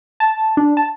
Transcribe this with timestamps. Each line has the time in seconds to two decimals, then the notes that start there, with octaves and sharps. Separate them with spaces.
0.20 A5
0.57 D4
0.77 A5